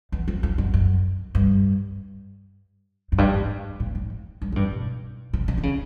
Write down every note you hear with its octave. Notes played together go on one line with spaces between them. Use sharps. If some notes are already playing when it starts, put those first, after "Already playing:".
E2
F2
F2
F#2
F#2
G2
F#2
G2
G#2
A2
G#2
G2
G#2
G2
B2
C3
C#3
D3
C#3